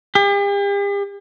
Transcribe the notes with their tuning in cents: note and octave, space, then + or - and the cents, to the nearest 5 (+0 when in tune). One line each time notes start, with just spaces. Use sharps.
G4 +45